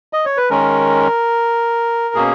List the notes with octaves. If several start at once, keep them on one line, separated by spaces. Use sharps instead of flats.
D#5
C#5
B4
D#3 G#3 C#4 A#4
B2 A#3 C#4 G#4